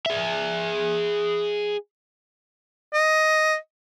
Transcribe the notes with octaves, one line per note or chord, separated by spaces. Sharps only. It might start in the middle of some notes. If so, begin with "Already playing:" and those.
G#4 E5
D#5